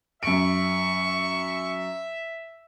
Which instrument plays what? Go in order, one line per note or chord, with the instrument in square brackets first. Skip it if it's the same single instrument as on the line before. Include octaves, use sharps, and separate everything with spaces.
[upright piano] F#2 D7 [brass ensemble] E5 [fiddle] C#6